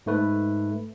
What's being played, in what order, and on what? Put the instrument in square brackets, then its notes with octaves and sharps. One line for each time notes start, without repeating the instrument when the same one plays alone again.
[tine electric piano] G#2 A3 B4